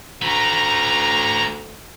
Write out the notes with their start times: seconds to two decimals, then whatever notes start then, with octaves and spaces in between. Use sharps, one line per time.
0.22 D2 A3 B4 A#5